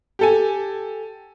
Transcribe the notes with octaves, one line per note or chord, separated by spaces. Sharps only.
G4 A4 G#5